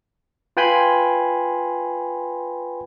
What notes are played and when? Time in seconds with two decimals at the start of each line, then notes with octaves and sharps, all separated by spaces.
0.57 F4 B4 G5 G#5 B5 C6